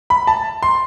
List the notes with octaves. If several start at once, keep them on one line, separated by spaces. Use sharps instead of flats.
B5
A5
C6